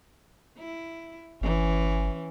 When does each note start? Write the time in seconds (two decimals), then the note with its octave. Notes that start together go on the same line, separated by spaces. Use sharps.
0.58 E4
1.41 G1 E3 C#4